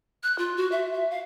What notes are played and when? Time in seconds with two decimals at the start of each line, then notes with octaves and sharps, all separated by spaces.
0.23 F#6
0.39 F4
0.57 F#4
0.72 E5
0.93 E5
1.11 F5